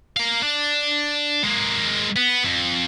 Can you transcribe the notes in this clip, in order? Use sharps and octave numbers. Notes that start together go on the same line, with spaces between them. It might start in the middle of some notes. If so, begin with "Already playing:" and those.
A#4 F5
D4
G#3 A#3
B3
F2